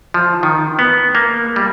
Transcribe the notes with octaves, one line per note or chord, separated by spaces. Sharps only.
F3
D#3
B3
A#3
G3